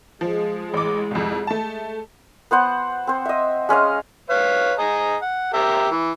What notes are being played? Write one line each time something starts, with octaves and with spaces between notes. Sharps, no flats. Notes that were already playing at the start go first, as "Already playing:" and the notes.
F3 G#3
A1 D6
C2 F2
A3 A5
B3 C5 F#5
C4 C5
D#5 E5
G#3 C#4 D#5 F5
B4 C#5 F5
G#4 D#5 A#5
F#5
G4 A#4 E5
E3